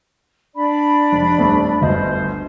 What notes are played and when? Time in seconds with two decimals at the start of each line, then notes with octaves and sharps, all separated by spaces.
0.56 D4 D5 B5
1.12 F1
1.38 D#1 A3
1.81 G1 D2 C5 D#5